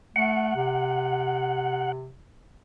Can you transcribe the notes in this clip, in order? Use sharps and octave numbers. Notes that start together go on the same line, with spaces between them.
A3 F#5
C3